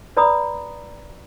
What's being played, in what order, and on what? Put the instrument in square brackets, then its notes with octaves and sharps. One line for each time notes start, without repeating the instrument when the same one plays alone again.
[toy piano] B4 D5 A#5 B5 D#6